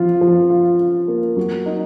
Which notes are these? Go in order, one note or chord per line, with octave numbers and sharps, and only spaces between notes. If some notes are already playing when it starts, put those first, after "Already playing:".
Already playing: F3 F4
F3
F4
F4
A#3
F#3
D#4